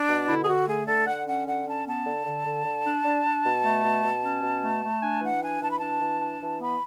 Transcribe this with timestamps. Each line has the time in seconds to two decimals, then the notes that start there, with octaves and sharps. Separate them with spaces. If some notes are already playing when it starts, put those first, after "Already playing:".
Already playing: D4
0.08 B2
0.27 D3 E4
0.43 G#4
0.47 D3 F#4
0.66 A3 G#4
0.86 D3 A4
1.06 D3 F#5
1.26 C#4 F#5
1.46 D3 F#5
1.66 C#4 A5
1.86 B3 A5
2.05 D3
2.26 D3
2.45 D3
2.65 D3
2.85 D4
3.05 D4
3.25 D4
3.44 B2
3.64 A3
3.83 B2
4.04 B2
4.23 C#4
4.42 B2
4.63 A3
4.82 A3
5.02 D4 G#5
5.21 E3 F#5
5.42 D4 G#5
5.62 E3 A5
5.70 B5
5.78 D4 A5
6.00 E3
6.21 D4
6.40 E3
6.60 B3 B5